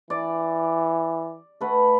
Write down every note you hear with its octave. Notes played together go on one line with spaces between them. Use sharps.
E3 D5
A3 B4 F#5